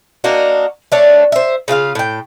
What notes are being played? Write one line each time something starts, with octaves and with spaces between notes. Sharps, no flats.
A#3 D4 D#4 F#4
A3 D4 C#5
C5 E5
C#3 F4 B4 F5
A2 G5